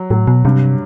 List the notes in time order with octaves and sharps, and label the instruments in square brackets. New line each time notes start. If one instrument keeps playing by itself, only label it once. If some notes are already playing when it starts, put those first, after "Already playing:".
Already playing: [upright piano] F#3
[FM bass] A2 [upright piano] F#3
[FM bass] B2
[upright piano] G2 [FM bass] C3